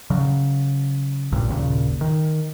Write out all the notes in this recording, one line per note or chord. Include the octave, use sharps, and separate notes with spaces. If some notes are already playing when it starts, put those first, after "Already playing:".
C#3 F#3
A1 G2 A#2
G#1 D#2 A#2 C#3
D#3